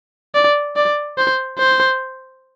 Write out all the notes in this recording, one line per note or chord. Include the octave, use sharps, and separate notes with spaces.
D5
D5
C5
C5